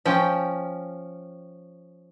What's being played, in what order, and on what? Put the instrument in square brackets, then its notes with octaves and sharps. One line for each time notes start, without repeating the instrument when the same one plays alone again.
[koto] F3 C#4 G5